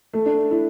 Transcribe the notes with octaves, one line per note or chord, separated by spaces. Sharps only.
A3
D4
E4